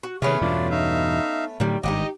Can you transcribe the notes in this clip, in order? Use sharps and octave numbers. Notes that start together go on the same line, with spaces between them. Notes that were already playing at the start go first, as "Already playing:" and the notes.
F#4
C3 D#3 A3 B3 C#4 G#4 F6
E2 G2 B2 D4 F4 D5
D#4 E5 F5
A2 D3 D#3 F#3 G3
G#1 G2 D#4 F#4 G4 D#5